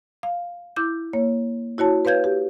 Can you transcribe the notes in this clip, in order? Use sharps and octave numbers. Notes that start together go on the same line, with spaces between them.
F5
E4 D6 G6
A#3 C#5
E4 F#4 C#5 A5
B4 C#5 F5 G6 G#6
G4